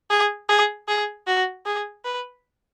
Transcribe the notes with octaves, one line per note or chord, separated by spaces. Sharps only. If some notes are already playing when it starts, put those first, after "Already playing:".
G#4
G#4
G#4
F#4
G#4
B4